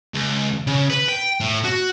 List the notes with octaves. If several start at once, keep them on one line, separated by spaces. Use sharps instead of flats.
C#2
C#3
B4
G5
A2
F#4